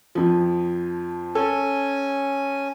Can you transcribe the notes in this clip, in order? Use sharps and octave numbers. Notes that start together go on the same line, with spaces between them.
F2 F3
C#4 A4 G#5